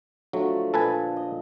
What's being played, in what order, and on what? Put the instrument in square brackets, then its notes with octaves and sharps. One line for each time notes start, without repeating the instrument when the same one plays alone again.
[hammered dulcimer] D3 F3 A3 [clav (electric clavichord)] F#3
[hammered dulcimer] A#2 [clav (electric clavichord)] A4 B4 G#5
[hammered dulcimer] D#5